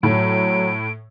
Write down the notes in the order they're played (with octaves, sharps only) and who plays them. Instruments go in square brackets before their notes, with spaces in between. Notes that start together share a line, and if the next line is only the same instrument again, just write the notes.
[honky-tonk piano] A2 [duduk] F#3 [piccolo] D7